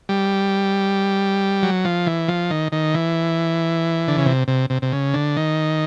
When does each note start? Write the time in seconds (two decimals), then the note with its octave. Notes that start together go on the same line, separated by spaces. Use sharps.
0.09 G3
1.63 F#3
1.85 F3
2.07 E3
2.28 F3
2.50 D#3
2.72 D#3
2.94 E3
4.08 D3
4.18 C#3
4.26 C3
4.48 C3
4.70 C3
4.82 C3
4.92 C#3
5.14 D3
5.37 D#3